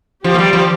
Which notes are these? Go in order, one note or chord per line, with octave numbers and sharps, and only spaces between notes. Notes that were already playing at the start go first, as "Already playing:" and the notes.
F3 G4
A#3
G3
F3